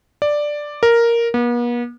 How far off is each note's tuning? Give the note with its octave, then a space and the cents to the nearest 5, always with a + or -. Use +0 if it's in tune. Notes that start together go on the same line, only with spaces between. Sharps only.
D5 +5
A#4 +0
B3 -45